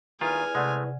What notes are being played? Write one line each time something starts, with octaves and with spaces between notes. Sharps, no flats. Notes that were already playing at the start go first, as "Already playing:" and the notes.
D#3 E4 F4 G#4 B4 G#5 F6
C3 G#3 A3 C4 D5 F#5